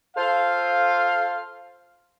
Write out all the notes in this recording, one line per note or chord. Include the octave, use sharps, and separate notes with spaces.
F4 A4 C5 F5